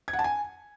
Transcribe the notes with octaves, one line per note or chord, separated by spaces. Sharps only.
G#6
F#5
A5
G#5